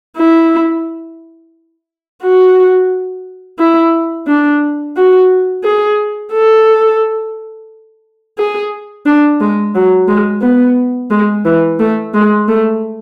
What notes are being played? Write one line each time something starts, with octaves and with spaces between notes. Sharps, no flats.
E4
F#4
E4
D4
F#4
G#4
A4
G#4
D4
G#3
F#3
G#3
B3
G#3
E3
A3
G#3
A3